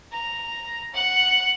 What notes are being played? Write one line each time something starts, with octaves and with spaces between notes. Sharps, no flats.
A#5
F#5